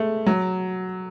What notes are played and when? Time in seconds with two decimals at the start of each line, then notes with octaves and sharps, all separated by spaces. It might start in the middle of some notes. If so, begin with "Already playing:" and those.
Already playing: G#3 A3
0.26 F#3